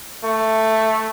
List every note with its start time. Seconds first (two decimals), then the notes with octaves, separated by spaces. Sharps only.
0.25 A3